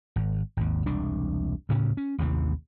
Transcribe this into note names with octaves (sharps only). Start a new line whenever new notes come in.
G#1
G#1 D#2
E1 C2 D4
D2 A2 C#3 C#4
C#4
A1 D#2 C3 E3